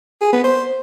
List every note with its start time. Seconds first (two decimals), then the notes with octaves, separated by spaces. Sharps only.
0.21 G#4
0.33 B3
0.44 C5